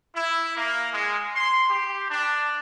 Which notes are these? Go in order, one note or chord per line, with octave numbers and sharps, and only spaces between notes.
E4
A#3
G#3
C6
G4
D4